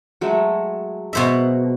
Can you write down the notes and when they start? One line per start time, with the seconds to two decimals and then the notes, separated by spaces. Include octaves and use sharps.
0.21 F#3 G#3 A3
1.13 B2 C5 E5 F#5 A#5